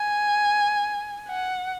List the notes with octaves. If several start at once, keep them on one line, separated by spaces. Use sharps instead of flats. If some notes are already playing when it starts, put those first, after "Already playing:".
Already playing: G#5
F#5